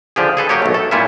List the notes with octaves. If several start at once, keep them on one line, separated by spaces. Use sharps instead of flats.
D3 F3 G4 G#4
G#4 A4 B4
F#3 A#3 G4 C#5
B1 A3
A4
A#2 G3 C#4 E4 F4 E5